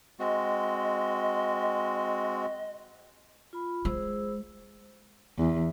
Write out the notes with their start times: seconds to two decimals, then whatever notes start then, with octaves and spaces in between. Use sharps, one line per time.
0.20 G#3 C4 F#4 D#5
3.53 F4 B5
3.85 G#3 G#4 C5 E6
5.39 E2